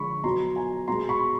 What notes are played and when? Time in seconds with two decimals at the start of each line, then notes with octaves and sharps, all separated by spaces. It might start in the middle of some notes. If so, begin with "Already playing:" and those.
Already playing: D3 F3 G#3 B5 C#6
0.24 B2 F#3 A#5 C6
0.56 G#5 A#5
0.88 B2 G#3 A#5 C6
1.09 B5 C#6